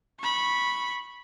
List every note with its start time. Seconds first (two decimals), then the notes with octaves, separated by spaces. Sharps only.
0.20 B5 C#6